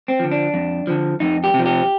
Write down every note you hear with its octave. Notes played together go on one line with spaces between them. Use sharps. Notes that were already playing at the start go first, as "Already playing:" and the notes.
C4
D3 F3
D4
F2
D3 F3
F2 D#4
G4
C3 F3
G4